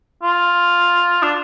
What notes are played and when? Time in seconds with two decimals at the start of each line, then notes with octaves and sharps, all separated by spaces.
0.23 F4
1.22 D4